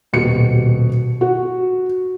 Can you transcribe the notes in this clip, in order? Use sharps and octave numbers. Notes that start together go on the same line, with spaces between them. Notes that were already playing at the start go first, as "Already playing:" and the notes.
D#1 B2 G4 C#7
F#4